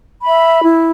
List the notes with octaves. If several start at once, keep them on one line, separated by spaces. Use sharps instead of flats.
E5 B5
E4